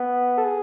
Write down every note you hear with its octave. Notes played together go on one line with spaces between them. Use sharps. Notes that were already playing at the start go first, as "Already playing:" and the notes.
Already playing: B3
A4
G#4